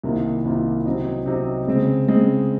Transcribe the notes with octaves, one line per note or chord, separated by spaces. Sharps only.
C2 C3 D#3 A#3 F4
C2 C3 D#3 A#3 F4
C3 F#3 C4 D#4
C3 F#3 C4 D#4
C#3 G#3 C4
C#3 G#3 C4